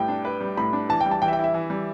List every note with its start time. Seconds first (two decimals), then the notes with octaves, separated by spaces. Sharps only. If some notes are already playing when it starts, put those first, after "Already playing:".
Already playing: A2 G3 B4 G5
0.08 D4
0.25 B4
0.41 G3
0.57 A2 B5
0.73 D4
0.89 E3 A5
1.01 G5
1.06 G3
1.11 A5
1.22 E3 G5
1.28 E5
1.33 G5
1.39 E4 E5
1.54 E3
1.70 G3